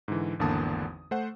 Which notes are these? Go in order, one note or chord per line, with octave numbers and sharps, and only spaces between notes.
G#2 D3 E3
G#1 E2 D3 A#3 A5 D#6
A3 C5 F#5